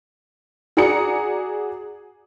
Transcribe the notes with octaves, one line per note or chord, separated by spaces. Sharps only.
F#4 G#4 D5 A#5 D#6 C#7